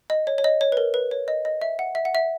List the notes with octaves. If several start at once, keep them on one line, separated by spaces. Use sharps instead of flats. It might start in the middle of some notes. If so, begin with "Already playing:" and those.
D#5
C#5
C#5
D#5
C#5
B4
A#4
B4
C#5
D#5
D#5
E5
F#5
E5
F#5
E5